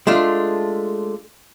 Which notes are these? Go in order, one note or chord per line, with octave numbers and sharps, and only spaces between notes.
G#3 A3 D4 F4